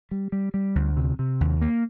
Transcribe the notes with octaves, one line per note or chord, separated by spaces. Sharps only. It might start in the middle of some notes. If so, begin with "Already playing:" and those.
G3
G3
G3
D2
C3
C3
D#2
A#3